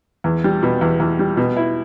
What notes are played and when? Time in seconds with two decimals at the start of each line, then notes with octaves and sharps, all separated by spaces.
0.24 E2
0.44 G3
0.63 B2
0.81 E2
1.00 E2
1.19 G3
1.37 B2
1.57 E4